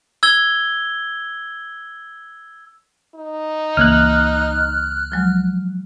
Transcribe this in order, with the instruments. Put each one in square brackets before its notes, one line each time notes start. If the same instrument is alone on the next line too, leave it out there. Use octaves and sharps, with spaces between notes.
[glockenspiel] E6 G#6 G7
[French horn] D#4
[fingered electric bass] C#2 A#3 [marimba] C#3 E3 [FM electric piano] F6 F#6
[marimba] F3 F#3 G#3